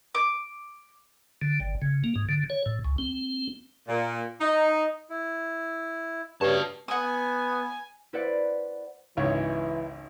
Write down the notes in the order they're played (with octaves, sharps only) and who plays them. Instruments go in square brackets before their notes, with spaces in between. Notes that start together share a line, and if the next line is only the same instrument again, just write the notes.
[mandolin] D6
[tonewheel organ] D3
G1
C#3
A#3
G#2
D3
C#5
A2
C#2
C4
[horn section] A#2
D#4
[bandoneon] E4
[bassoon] G2 [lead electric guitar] F#4 A5 [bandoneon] C#5
[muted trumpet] B3 [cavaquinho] F#5 D#6 [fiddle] G#5
[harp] E4 B4 C5 D5 F#5
[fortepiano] G#1 C#2 C#5 [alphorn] E3